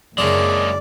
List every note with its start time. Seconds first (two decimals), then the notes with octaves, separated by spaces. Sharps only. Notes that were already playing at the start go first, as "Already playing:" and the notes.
0.18 F#1 C#3 G#3 A#3 D4 E4 D5